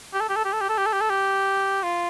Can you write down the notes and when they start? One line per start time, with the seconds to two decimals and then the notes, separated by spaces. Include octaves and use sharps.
0.13 G4
0.20 A4
0.29 G4
0.36 A4
0.45 G4
0.53 A4
0.61 G4
0.69 A4
0.78 G4
0.86 A4
0.93 G4
1.01 A4
1.10 G4
1.84 F4